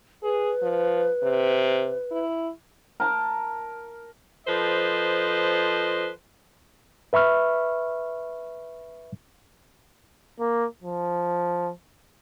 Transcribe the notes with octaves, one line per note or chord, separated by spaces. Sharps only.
G#4 B4
F3
C3
E4
A#4 A5
F3 A4 B4 C5 D#5
B4 E5 B5 C#6 F6
A#3
F3